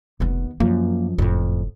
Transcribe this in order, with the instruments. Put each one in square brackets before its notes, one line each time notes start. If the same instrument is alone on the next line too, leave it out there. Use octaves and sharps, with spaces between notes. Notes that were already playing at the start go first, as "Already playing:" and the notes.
[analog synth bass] F1 [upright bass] D#2 B3
[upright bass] F#2 F3 [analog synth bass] A#3
[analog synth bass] F#1 [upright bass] F2 A2